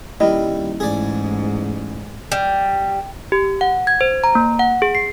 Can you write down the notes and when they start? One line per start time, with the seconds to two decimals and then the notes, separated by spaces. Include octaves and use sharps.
0.20 D#1 G3 E4 A#4 D#5
0.80 A1 G#2 G#4 D5
2.32 G3
3.32 G4
3.61 F#5
3.87 G#6
4.01 C5
4.24 A#5
4.35 A#3
4.59 F#5
4.82 G#4
4.95 C7